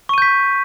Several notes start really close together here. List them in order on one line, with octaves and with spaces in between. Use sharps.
C#6 D#7 G6 B6